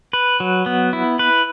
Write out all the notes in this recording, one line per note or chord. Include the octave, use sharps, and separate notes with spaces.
B4
F#3
B3
E4
B4